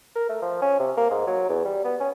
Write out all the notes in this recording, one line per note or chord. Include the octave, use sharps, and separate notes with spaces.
A#4
A3
F3
C#4
C3
A#3
G#2
F#3
E2
G3
B3
C#4